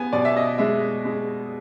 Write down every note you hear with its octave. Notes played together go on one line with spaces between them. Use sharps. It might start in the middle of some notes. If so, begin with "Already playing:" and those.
Already playing: B3 G#5
B2 D5
E5
D#5
G#3 E5
G#3